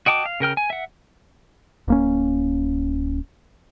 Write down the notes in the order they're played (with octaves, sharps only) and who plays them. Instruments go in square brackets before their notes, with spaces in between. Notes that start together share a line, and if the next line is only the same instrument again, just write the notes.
[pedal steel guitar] F#4 D#5 G5 A5 D6
F5
C#3 A#4 G5 F6
G#5
E5 F#5
[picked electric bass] D1 A#3 C#4